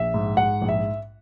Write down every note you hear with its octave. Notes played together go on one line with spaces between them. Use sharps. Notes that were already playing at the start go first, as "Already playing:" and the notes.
Already playing: A#1 E5
G#2
G#2 F#5
A#1
E5